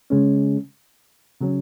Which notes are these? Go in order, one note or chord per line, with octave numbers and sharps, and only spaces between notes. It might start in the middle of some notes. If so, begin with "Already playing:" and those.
C#3 G#3 C#4
C#3 F#3 C#4